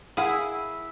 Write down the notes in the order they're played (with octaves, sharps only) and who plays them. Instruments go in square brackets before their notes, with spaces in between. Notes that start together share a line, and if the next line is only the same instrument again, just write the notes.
[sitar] E4 [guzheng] G#4 [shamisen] A#4 F5 F#5